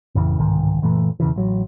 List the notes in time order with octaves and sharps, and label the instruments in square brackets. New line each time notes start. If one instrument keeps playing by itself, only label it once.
[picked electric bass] A1 F2 C#3 E3
G1 C2 G#2 D#3
F#1 A#2 E3 A3
E1 C#3 E3
A1 F#3